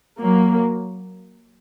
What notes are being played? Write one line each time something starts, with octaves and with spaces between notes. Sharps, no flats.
F#3 A#3